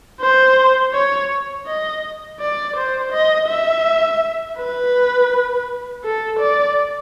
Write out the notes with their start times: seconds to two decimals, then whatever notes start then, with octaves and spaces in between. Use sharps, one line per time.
0.21 C5
0.94 C#5
1.67 D#5
2.40 D5
2.76 C5
3.12 D#5
3.48 E5
4.58 B4
6.04 A4
6.39 D5